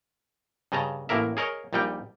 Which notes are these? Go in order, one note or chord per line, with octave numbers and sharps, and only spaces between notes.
G2 C#3 D#5 A5 A#5
A1 A2 A#3 A#4 E5
G#4 A#4 C#5 D#5
A#1 A#2 G3 D#4 G5